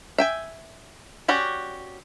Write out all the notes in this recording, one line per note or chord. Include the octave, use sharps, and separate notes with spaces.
E5 G5 G#5
C#4 F#4 G4 D5